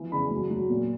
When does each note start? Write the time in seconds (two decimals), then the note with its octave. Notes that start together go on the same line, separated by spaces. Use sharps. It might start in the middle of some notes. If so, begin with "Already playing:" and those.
Already playing: E3 F3
0.12 C#3 B5
0.30 F#3
0.50 F#3
0.69 A#2